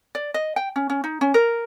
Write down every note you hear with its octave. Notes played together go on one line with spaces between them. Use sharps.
D5
D#5
G5
C#4
C#4
D#4
C#4
A#4